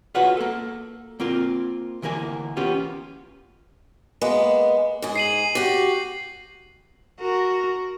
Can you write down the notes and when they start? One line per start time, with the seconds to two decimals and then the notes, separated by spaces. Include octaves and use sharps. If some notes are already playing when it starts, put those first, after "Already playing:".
0.15 F4 F#4 G#4 B4 C#5 F#5
0.37 A#3 A4
1.20 A#3 C4 F4 A#4
2.02 D2 E3 A#3 A#4 G#5
2.57 A#3 B3 C#4 F4 G4
4.21 G#3 A#3 B3
5.02 G#2 G#4
5.16 C7 D#7 F#7
5.55 F#4 G4
7.20 F#4 A#4